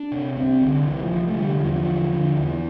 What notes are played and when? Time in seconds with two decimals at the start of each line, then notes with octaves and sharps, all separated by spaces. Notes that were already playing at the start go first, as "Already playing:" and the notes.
Already playing: D4
0.12 C3
0.36 C2 C4
0.61 C2 D3
0.86 C2 E3
1.03 F3
1.12 C2
1.28 A3
1.36 D3 G3
1.57 E3
1.61 E2 F3
1.87 D3
2.12 D3
2.37 E2 E3